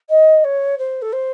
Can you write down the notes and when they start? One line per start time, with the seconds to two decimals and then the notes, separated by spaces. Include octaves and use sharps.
0.09 D#5
0.44 C#5
0.78 C5
1.01 A4
1.12 C5